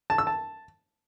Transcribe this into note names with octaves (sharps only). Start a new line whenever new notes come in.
A5
E6
A5